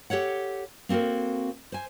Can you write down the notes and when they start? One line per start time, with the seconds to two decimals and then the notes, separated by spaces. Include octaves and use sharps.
0.10 G4 A4 C#5 F#5
0.89 A#3 C4 F#4 A4 A#4
1.72 C5 G#5